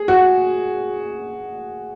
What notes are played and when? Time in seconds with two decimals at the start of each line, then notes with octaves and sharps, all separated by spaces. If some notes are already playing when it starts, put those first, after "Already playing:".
Already playing: G#4
0.08 F#4